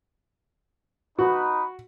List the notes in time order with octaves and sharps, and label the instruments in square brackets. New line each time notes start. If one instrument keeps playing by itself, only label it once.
[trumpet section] D#4 B4 [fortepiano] F#4